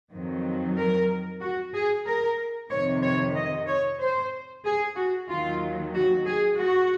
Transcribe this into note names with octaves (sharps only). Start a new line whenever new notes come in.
F2 D#3 F#3
A#4
F#4
G#4
A#4
F2 C3 D#3 C#5
C#5
D#5
C#5
C5
G#4
F#4
D#2 D#3 F#3 F4
F#4
G#4
F#4